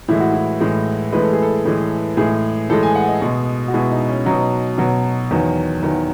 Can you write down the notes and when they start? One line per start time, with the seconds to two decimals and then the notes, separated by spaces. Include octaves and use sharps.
0.08 A2 E3 G#3 E4
0.20 F#4
0.33 E4
0.61 A2 E3 G#3
1.13 A2 E3 G#3 B4
1.23 A4
1.33 G#4
1.42 A4
1.65 A2 E3 G#3
2.17 A2 E3 G#3 G#4
2.70 A2 E3 G#3 A4
2.83 G#5
2.95 F#5
3.09 D#5
3.22 B2 G#3
3.68 F#4
3.74 B2 G#3 E4
3.91 D#4
4.09 C#4
4.26 B2 F#3 D#4
4.78 B2 F#3
5.31 E2 D#3 F#3
5.83 E2 D#3 F#3